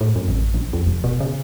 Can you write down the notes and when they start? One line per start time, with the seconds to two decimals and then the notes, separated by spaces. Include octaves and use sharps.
0.01 A2
0.16 F#2
0.28 A1
0.54 A#1
0.73 F2
0.87 F1
1.04 B2
1.20 C#3